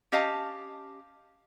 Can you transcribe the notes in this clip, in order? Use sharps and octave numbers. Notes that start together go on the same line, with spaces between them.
C#4 G4 D#5 F5 A5